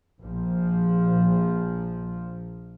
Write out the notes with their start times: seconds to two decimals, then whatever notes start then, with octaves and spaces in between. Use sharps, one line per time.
0.20 A#1 F3